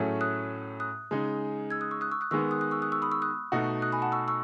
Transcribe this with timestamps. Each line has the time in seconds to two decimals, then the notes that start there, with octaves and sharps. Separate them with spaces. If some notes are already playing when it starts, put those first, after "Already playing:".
Already playing: A2 F#3 A3 C#4 G#4
0.21 D#6 F#6
0.80 D#6 F#6
1.11 C#3 G#3 D#4
1.70 E6 G#6
1.81 D#6 F#6
1.91 C#6 E6
2.01 D#6 F#6
2.12 C#6 E6
2.21 D#6 F#6
2.31 D#3 G#3 B3 C#6 E6
2.51 D#6 F#6
2.61 D#6 F#6
2.71 C#6 E6
2.82 D#6 F#6
2.92 C#6 E6
3.02 B5 D#6
3.12 C#6 E6
3.22 D#6 F#6
3.52 B2 A3 D#4 F#4
3.82 D#6 F#6
3.92 G#5 B5
4.02 F#5 A5
4.12 C#6 E6
4.28 C#6 E6